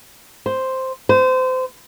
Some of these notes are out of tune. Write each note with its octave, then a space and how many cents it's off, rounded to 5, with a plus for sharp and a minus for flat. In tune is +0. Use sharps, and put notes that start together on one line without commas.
C5 +0
C5 -30